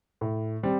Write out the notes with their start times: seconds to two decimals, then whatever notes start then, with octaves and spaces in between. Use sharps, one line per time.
0.21 A2
0.63 G3 C4